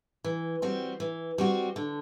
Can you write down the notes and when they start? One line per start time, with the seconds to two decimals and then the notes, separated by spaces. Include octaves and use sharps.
0.24 E3
0.62 G3 C4 F#4
1.00 E3
1.38 G3 C4 F#4
1.76 D3